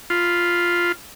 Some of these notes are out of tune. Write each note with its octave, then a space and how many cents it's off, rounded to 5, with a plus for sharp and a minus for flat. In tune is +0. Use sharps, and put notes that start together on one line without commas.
F4 +0 B5 +0